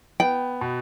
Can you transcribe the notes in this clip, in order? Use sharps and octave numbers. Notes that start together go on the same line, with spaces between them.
B3 G5
B2